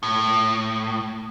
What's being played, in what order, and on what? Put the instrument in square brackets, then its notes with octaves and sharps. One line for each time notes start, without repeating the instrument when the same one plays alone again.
[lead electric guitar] A2